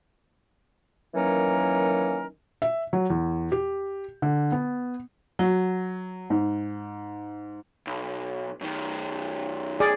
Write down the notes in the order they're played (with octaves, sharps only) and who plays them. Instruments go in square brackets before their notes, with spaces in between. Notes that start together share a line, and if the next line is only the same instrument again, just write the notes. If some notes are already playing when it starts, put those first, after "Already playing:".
[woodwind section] D#3 E3 F#3 A#3 C#4 A#4
[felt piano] E5
F#3
E2
G4
D3
B3
[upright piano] F#3
G#2
[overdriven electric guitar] B1
F#2 D#3
[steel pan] G#4 D5